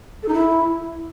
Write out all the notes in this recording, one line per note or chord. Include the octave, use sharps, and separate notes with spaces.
A4
D#4
E4